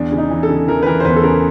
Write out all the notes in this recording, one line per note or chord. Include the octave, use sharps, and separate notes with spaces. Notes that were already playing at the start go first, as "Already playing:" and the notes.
Already playing: E2 D4
C#3
D#4
E3
A4
C#3
E3 A#4
B4
E3 A#4
C5
E2 B4
A4
C#3 A#4